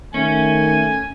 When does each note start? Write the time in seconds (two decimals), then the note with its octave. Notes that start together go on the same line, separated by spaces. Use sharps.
0.14 D#3 A3 C#4 G#5